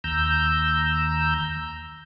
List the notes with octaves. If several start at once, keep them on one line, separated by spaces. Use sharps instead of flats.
D#2 A#5 E6 G6